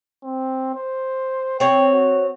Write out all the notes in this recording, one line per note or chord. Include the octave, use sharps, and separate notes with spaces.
C4
C5
C4 C#5 G5
F#4